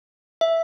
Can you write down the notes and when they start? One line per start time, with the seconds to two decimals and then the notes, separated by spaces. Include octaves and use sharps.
0.41 E5